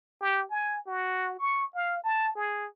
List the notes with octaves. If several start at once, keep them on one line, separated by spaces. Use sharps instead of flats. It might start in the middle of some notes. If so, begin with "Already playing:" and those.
G4
G#5
F#4
C#6
F5
A5
G#4